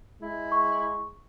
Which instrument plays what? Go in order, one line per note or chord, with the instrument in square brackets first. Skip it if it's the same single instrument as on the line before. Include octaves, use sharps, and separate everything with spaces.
[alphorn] G#3 [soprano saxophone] E4
[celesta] C#6